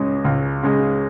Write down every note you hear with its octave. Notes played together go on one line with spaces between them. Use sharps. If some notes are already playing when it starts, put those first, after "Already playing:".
Already playing: C#2 C#3 G#3
C#2
C#3 G#3